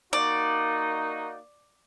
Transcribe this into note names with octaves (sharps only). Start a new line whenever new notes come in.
A#3 D#4 F#4 D5